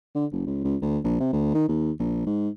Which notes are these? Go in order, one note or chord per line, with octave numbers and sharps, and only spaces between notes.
D3
F#1
C#2
C#2
D2
A#1
C3
D2
D#3
D#2
A#1
G#2